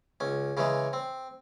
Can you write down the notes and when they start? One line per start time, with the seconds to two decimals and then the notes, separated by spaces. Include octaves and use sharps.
0.20 C#2 C#4
0.57 C#3 E3 G#3 C#4
0.93 C4